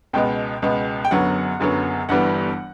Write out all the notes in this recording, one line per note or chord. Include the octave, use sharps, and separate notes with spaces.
C#2 B2 G#3 B3 G5
C#2 B2 G#3 B3
G5
F#1 F#2 D3 F#3 B3 F#5
F#1 F#2 D3 F#3 B3
G1 G2 E3 G3 B3 F#5